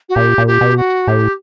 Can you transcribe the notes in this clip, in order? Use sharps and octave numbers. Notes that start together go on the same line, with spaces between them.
F#4
A#2 G4
A#2
G4
B2
F#4
A2 G4